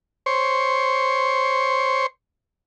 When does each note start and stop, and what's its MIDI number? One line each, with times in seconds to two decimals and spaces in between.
0.26 2.06 72
0.26 2.06 73